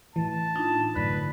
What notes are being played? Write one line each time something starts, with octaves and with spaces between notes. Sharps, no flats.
A2 E3 A5
D4 D#4 F4
F#2 A2 D3 B4